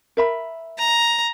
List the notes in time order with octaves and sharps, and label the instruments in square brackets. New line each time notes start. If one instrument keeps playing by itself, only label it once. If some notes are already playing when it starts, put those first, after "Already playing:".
[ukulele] A#4 E5 B5
[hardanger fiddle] A#5